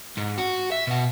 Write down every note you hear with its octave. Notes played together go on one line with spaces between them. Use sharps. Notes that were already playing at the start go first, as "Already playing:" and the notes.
G#2
F#4
E5
B2 F#4